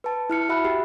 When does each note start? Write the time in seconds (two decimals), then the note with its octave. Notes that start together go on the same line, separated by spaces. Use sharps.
0.04 B4 A5
0.30 E4 F6 C#7
0.49 F#4 E5 B5 F#6
0.65 G4